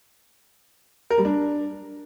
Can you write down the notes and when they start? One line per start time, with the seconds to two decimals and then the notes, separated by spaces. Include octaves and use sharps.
1.10 A#4
1.18 G3
1.25 D4